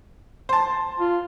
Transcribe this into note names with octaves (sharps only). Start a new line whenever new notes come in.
C5 A5
F4